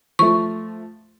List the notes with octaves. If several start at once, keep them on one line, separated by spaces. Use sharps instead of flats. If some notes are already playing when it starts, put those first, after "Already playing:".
F3 A3 C#6